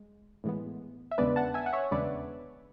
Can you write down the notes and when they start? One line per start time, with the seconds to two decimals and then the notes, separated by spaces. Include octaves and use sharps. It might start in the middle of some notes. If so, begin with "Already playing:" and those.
Already playing: G#3
0.44 A2 E3 G#3 B3
1.11 E5
1.18 E2 C#3 G#3 B3 D4 B4 D5
1.36 F#5 A5
1.54 E5 G#5
1.66 F#5
1.73 C#5 E5
1.91 E2 C#3 G#3 B3 D4 B4 D5